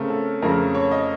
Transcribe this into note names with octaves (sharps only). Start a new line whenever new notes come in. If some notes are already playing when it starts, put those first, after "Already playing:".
Already playing: C#3 A3 C4 A#4
A4
F2 C#3 A3 A#4
C#5
D#5